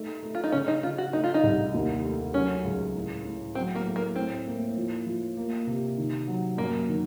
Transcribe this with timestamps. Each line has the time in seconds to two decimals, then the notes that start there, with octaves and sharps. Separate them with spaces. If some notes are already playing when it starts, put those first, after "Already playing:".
Already playing: A3 D#4
0.23 A3
0.35 F4
0.44 D#4
0.52 C#3 C#4
0.68 D#4
0.83 C#3 F4
0.98 F#4
1.13 A3 D#4
1.24 F4
1.34 D#4
1.44 C2
1.74 D#2
2.05 A3
2.34 F#3 C#4
2.64 C#2
2.95 A2
3.25 A2
3.55 F#3 C4
3.75 A#3
3.86 A3
3.96 A#3
4.16 A2 C4
4.47 A#3
4.77 F3
5.07 F3
5.37 A#3
5.67 C3
5.97 D#3
6.27 F#3
6.58 F#2 A#3
6.89 D#3